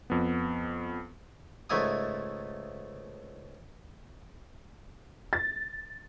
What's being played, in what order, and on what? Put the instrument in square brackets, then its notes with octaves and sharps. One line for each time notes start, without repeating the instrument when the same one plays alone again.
[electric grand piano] F2 B3
[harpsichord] C#2 G#2 A3 E5 G#5 D#6
[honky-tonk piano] A6